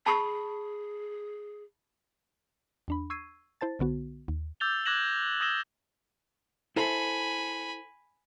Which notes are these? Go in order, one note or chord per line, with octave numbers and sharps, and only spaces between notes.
G#4 A5 B5 C#6
E2 D4 B5
C#6 E6 G#6 C7 D#7
E4 C5 A5 A6
B1 D3 B3 F#4
D#2
D6 E6 G6 A6 F7 G7
D6 F#6 G#6 A#6 E7 F#7
D#6 E6 G#6 A#6 E7 G7
E4 A4 C5 G#5 B5